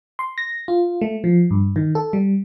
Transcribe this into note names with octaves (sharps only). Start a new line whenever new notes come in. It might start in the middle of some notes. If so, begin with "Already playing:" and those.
C6
A#6
F4
A3
F3
G2
D#3
A4
G3